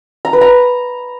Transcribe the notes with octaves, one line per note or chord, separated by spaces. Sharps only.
A#5
B4
A#5